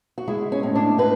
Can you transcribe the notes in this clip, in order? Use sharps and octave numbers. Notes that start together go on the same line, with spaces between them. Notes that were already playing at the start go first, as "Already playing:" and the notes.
F#4
G#3 E4
C#4
A2
D4
A2 B4